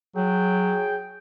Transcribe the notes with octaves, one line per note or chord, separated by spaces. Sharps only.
F#3 G#4 G5